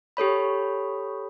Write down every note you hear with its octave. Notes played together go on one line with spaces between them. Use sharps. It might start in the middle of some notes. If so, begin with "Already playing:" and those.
G4 A4 C#5 B5